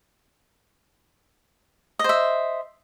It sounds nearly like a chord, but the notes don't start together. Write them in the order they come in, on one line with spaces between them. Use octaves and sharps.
D#5 C5 E5